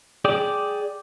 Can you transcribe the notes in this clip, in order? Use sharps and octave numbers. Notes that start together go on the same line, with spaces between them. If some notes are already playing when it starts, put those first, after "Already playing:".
G#4 D5 G5